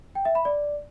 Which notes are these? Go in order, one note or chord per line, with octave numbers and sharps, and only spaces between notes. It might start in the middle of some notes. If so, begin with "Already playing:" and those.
G5
E5
B5
D5